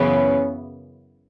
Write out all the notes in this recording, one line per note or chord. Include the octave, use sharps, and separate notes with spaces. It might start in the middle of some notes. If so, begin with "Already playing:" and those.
Already playing: F#2 C#3 E3 B3 C#4